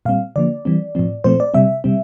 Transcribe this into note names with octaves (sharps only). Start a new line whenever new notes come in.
A#2 G3 C4 F5
D3 F3 A#3 D5
E3 G3 C4
A2 F3 C4
A#2 F3 A3 C4 C5
D5
C3 G3 C4 E5
C3 G3 C4